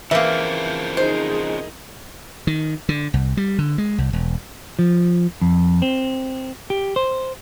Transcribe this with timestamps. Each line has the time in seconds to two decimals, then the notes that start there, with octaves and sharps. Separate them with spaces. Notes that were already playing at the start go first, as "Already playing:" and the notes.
0.11 C#3 E3 F3 A#3 C4 E5
0.97 D#4 G#4 C5 D#5
2.47 D#3
2.89 D3
3.14 C2
3.37 G3
3.59 D3
3.78 G#3
3.98 C2
4.13 E1
4.79 F3
5.41 F2
5.82 C4
6.70 G4
6.96 C5